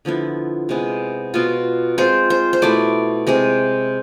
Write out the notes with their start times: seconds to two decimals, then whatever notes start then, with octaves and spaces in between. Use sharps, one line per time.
0.05 D3 F3 B3 E4
0.69 C3 G#3 B3
1.34 B2 B3 F4
1.98 G#3 C4 F4 C5
2.30 C5
2.53 C5
2.62 B2 A3 E4 D5
3.27 C3 G#3 C4